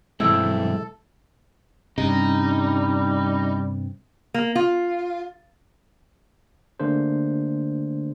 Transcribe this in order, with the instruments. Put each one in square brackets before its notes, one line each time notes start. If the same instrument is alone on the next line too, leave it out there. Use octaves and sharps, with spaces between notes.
[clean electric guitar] B1 G2 C4 [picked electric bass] E3 F#3 G#3 [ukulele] E4 [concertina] A4
[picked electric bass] G2 C3 [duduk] G3 [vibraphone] C#4 [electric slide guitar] D#4
[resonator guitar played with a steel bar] A#3
F4
[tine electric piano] D3 A3 A#3 D4 G#4 C5